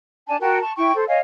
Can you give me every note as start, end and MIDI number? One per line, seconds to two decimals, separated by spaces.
0.27 0.36 62
0.27 0.36 80
0.27 0.36 81
0.41 0.59 66
0.41 0.59 70
0.41 0.59 79
0.41 0.59 81
0.62 0.73 81
0.62 0.73 85
0.77 0.92 64
0.77 0.92 79
0.77 0.92 85
0.95 1.05 69
0.95 1.05 72
1.08 1.19 73
1.08 1.19 75
1.08 1.19 77
1.08 1.19 80